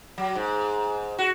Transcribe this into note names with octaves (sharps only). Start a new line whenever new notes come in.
F#3
G#2
F#4